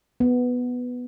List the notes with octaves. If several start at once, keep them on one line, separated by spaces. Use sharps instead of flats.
B3